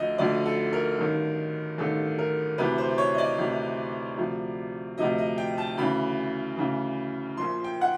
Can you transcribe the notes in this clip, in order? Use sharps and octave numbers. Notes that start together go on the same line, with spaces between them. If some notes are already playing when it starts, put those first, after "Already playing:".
Already playing: D2 D3 F3 D#5
D2 D3 F3 D5
A4
A#4
A1 G2 D#3
A1 G2 D#3 A4
A#4
D2 C3 E3 B4
C5
C#5
D#5
D5
D2 C3 E3
D2 C3 F3
D2 C3 F3 D#5
D#5
G5
A5
D2 C#3 E3 B5
D2 C#3 E3
A#1 A#2 F3 C6
G5
F#5